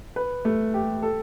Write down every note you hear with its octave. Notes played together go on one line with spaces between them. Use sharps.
B4
A3
G4
A4